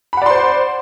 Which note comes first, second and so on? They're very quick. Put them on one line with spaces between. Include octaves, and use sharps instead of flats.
B5 F#5 D5 C6 C5